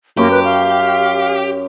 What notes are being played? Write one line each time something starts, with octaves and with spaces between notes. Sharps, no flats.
F#2 A#3 G4 C#5
B4
F5